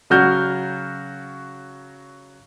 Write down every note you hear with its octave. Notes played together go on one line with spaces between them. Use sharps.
C#3 F#3 F#4 F6 G6